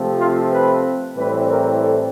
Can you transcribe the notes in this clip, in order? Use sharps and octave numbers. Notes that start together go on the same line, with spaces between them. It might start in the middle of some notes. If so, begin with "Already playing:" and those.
Already playing: C3 F3 A3 C4
F4
B4
A2 E3 G3 C4 B4
A#4
A4